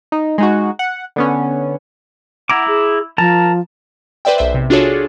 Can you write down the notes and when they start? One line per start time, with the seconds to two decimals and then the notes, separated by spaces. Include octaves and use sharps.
0.12 D#4
0.38 G#3 D#4 F#4
0.79 F#5
1.16 D3 B3 C#4
2.50 E4 F#5 A#5 D6
2.68 G#4
3.18 F3 A#4 A5 A#5
4.25 B4 C5 D5 E5 G5
4.38 B1 C5 E5
4.54 C3
4.70 D4 F4 F#4 G#4 A4 C#5